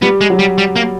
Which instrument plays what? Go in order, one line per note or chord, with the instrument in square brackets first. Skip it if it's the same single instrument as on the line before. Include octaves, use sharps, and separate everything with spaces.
[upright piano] G3 [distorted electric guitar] B3
[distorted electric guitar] G#3
[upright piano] F#3
[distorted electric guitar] G3
G3
A#3